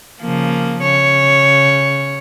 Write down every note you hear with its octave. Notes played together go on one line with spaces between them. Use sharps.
C#3 F3 A#3
C#3 C#5